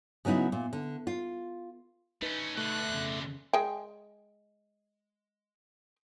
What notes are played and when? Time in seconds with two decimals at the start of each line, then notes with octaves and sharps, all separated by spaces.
0.25 C#3 F#3 B3 D#4 E4
0.52 A#2
0.73 D3
1.07 F4
2.22 A3 C#4 D#4 B4
2.58 B2 D3 A3 F#6
2.90 F2 C#3
3.53 G#3 G5